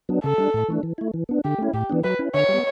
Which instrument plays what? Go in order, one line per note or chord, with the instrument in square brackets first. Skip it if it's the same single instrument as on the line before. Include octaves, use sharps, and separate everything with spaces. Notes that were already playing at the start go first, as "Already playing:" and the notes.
[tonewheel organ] F#3 B3 D4
[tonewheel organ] C#3 [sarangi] A4
[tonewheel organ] G3 D4
A2
E3 A3 D4
E3
A3 E4
E3
B3 D4
[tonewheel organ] D3 [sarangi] G4
[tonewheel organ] A3 C#4 E4
[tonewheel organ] A2 [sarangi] G4
[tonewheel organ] E3 B3 D4
[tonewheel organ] F#3 [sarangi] B4
[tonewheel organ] C#4 E4
[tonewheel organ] D3 [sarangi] C#5
[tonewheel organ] G3 B3